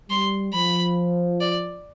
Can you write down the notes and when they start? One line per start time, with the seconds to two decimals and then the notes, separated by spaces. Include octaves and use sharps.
0.10 G3 C6
0.54 F3 B5
1.41 D5